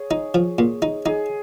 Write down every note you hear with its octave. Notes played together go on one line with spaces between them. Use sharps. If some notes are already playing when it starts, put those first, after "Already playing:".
Already playing: G#4 C#5
D#4
F3
A#2
D#4
D#4 G#4